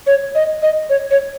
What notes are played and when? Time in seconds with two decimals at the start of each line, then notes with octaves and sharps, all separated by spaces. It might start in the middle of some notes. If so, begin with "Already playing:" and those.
0.07 C#5
0.35 D#5
0.62 D#5
0.89 C#5
1.11 C#5